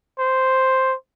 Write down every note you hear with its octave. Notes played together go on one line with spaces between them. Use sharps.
C5